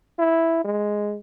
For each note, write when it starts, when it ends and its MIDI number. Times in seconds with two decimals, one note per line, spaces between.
0.19 0.64 64
0.64 1.17 56